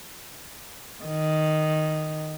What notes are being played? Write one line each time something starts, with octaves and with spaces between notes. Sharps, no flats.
D#3